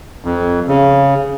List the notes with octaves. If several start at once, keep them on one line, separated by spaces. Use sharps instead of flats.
F2
C#3